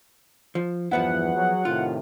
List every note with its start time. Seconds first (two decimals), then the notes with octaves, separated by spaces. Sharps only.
0.55 F3
0.91 E2 G2 F3 B3 E4 F#5
1.35 F#3 G#4
1.65 A2 C3 D#3 F4